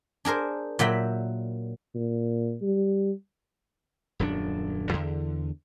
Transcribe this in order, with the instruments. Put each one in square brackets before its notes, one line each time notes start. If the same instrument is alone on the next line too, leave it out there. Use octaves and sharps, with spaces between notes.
[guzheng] D4 G#4 A#4 C5
A#2 F#3 E5 G5 B5
[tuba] A#2
G3
[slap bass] D#1 F#2 F3 D4
E2 D3